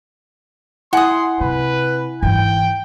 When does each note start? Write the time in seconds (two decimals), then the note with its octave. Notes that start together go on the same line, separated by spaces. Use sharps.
0.93 E4 F#5 G#5 C6 D#6
1.41 C3 B4
2.23 G#2 E3 G5